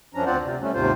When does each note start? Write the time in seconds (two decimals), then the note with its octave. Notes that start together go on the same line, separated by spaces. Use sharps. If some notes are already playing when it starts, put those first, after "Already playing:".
0.14 F#2 F3 C#4 D4 A#5
0.26 D2 C4 F4 C5 D5 F#5
0.43 C3
0.61 G3 A3 C#4
0.74 D#2 G#2 C3 F4 C5